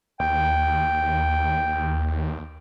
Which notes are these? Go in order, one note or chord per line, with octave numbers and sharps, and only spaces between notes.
D#2 G5